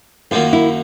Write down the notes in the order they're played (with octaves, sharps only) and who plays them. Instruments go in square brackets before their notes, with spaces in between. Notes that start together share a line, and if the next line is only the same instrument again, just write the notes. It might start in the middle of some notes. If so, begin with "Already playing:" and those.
[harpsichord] F#2 D#3 F#3 A#3 [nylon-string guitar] F4
[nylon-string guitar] E4